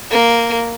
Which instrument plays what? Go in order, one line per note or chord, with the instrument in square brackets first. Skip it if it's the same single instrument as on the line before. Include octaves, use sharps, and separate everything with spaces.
[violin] A#3